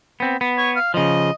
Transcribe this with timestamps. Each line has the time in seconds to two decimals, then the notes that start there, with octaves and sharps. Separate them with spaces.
0.20 B3 C4
0.41 B3
0.58 C#5
0.76 F5
0.94 C#3 F3 D#5